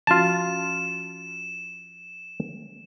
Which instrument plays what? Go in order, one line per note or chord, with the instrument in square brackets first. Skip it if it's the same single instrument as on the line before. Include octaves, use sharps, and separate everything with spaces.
[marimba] F3 C#4 F#4 [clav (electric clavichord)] F4 A5 [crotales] E7